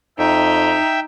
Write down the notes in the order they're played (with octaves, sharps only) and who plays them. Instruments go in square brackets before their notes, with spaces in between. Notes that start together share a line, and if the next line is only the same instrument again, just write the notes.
[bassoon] F2 [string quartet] D#4 [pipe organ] E5 G5